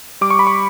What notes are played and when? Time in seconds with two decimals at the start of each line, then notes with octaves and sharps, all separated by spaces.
0.21 G3 D6
0.30 C#6
0.39 B5
0.47 C#6